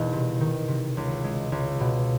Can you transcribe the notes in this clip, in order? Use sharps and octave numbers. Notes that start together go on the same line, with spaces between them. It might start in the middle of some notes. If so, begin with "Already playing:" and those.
Already playing: E1 D#3
C3
D#3
C3
C#2
G#3
C#2
B2